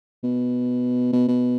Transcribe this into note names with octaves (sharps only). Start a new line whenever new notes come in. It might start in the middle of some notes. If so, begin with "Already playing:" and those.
B2
B2
B2